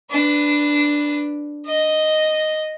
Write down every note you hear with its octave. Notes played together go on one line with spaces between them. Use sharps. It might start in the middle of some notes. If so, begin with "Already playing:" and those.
D4 B4
D#5